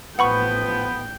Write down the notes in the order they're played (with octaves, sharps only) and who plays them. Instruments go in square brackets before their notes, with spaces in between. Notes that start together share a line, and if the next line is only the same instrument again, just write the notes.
[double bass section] A1 A2 [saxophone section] F3 B3 [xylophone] F#5 B5 C#6 [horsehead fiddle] G5